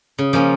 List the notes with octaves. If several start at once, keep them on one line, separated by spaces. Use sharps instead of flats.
C#3
F3 A#3 C#4 F4